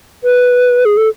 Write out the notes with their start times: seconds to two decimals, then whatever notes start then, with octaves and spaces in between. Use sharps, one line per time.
0.24 B4
0.85 G#4
0.97 A4